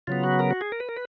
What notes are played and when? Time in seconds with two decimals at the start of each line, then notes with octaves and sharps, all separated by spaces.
0.07 C#3 F#3 B3 F4
0.24 F#4
0.39 A#4
0.51 F#4
0.61 G#4
0.72 A#4
0.80 B4
0.89 A#4
0.96 B4